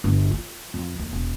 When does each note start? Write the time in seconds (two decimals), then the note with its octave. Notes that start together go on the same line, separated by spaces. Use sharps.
0.04 G1
0.30 F4
0.74 F2
0.99 D#2
1.13 E1